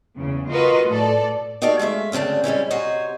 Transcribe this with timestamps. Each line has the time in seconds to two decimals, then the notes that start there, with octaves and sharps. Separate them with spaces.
0.17 E2 C#3
0.51 F4 F#4 A#4 B4 D#5
0.89 A2 A4 D5
1.62 D#4 F#4 G4 A4 D5 F5
1.79 G#3 A3 E5 F5
2.12 D2 C#3 C4 D4 G5
2.44 G3 G#3 C#4 E4
2.70 C3 F#4 C5 C#5 D#5